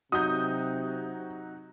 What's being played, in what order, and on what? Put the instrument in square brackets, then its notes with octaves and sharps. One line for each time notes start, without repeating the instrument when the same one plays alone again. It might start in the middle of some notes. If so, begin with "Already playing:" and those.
[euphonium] C3 [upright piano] F#3 D#4 F#4 [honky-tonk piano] D#6 G6